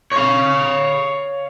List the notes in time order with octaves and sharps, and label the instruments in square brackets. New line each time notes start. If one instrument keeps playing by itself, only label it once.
[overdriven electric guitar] C#5 F5